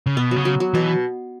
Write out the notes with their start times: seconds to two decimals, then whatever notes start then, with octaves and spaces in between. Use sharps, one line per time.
0.06 C#3
0.17 B2 B3
0.31 C#3 F#3
0.45 F#3
0.60 F#3
0.74 B2 E3